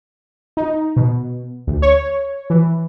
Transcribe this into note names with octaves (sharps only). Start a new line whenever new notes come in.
D#4
B2
D2
C#5
E3